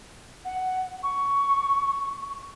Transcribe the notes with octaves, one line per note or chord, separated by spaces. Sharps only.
F#5
C#6